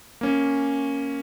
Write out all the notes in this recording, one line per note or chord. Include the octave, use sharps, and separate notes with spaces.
A#3 C#4